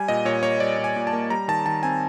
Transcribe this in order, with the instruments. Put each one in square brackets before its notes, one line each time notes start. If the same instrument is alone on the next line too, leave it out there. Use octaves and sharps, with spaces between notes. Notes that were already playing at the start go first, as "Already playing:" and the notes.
Already playing: [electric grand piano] G3 G#5
A#2 D#5
A#2 C#5
A#3 C#5
G3 D5
A#2
G#5
A#2
A5
A#3
G3 A#5
D#3 A5
D#3 A5
C4 G#5